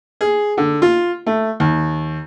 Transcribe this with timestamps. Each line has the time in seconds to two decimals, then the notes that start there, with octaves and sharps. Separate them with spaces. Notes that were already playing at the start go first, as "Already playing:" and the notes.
0.21 G#4
0.57 D3
0.82 F4
1.27 A3
1.60 D#2